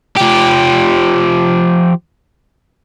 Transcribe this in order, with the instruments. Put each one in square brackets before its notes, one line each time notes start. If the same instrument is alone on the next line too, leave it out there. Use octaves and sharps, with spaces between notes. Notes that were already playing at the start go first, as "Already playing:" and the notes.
[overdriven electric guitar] F3 G4